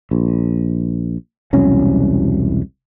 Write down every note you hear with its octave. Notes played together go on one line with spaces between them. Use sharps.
A#1
E1 C2 F#3 C#4